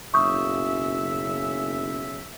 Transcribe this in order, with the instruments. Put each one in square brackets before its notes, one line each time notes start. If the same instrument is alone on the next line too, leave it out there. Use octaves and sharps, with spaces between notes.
[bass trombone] F#1 [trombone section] B1 C#3 [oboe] E5 [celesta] C#6 D#6 G6